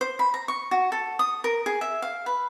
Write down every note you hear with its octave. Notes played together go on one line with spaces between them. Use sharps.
C5
B5
A#5
C#6
F#4
A4
D#6
A#4
G#4
E5
F5
B4